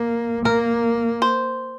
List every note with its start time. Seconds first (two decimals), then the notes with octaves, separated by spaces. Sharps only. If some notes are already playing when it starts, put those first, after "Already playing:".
Already playing: A#3
0.45 A#3 A#4
1.22 C5